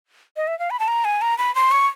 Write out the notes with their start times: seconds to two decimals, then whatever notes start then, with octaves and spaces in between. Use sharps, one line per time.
0.37 D#5
0.47 E5
0.59 F5
0.71 B5
0.79 A5
0.88 A#5
1.05 G#5
1.21 A#5
1.38 B5
1.55 C6
1.71 C#6